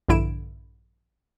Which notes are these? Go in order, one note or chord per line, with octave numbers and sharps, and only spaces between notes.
A#1 G2 D3 E4 D7 E7